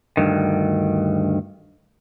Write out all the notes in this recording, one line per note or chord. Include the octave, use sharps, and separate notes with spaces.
D2 G2 D#3